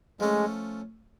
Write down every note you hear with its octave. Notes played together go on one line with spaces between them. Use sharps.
F3 G#3 A3 C#4